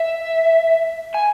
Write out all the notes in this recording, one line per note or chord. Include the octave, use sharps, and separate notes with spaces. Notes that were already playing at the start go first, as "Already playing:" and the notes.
Already playing: E5
G#5